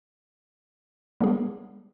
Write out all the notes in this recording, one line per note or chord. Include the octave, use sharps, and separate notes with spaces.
G3 G#3 B3 D4 G4 G#4